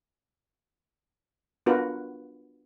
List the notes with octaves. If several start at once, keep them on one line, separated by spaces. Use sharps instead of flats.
B3 D4 F4 F#4 A#4 B4